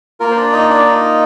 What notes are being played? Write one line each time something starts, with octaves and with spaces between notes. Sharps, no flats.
A#3 F4 A#4
C5
D4 D5
D#4 D#5
D4 D5
D#4 D#5